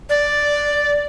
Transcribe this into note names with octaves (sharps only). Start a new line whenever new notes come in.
D5